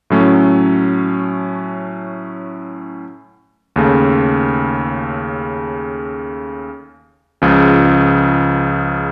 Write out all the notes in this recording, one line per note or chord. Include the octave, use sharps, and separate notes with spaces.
A2 F#3 A3 C#4
D#2 C#3 A3
C#2 C#3 F3